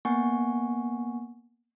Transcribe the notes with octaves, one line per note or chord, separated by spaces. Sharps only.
A#3 B3 F#5 G#5 C#6